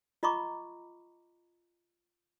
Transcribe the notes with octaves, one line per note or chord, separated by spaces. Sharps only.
F4 D#5 A#5 B5 C#6 D6